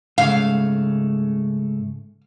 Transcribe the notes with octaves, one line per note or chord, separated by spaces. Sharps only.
G#2 C#3 A3 F5